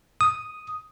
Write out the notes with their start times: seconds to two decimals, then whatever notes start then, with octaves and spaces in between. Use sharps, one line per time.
0.21 D#6